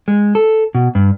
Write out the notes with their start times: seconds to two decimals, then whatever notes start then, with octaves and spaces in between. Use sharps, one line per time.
0.08 G#3
0.35 A4
0.75 B2
0.95 G2